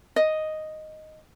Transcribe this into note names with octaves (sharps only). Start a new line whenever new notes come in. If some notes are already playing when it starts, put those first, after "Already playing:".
D#5